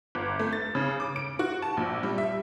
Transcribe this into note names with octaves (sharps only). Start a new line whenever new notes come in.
G1
A3
A6
C#3
D6
D7
F#4
A5
A#1
G3
E5